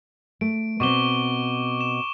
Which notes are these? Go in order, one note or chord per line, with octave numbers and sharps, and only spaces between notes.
A3 D7
B2 C4 C#6 D6 G7
E7